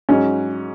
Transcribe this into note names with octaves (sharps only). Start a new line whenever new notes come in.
G#2 F#3 C#4